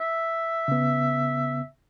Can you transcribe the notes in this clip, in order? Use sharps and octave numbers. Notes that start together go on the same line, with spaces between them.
E5
C#3 B3